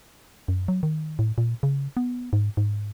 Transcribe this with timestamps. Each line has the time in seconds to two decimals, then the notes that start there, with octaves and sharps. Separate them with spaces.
0.48 F#2
0.68 F#3
0.83 D#3
1.19 A2
1.38 A#2
1.63 C#3
1.97 B3
2.33 G#2
2.57 G#2